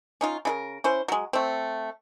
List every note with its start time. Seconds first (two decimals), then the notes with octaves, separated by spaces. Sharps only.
0.21 C#4 D#4 F4
0.45 C#3 E4 A#4
0.84 C#4 E4 C5
1.08 F#3 G#3
1.33 A3 C4